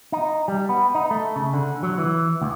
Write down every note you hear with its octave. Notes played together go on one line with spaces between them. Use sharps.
D#4
G3
B3
D#4
A3
C#3
D3
F#3
E3
D2